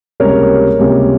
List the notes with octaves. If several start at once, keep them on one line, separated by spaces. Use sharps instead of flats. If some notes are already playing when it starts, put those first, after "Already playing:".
C#2 C3 G3 A#3 C#4 A#4 C#5
C#2 C3 G3 A#3 C#4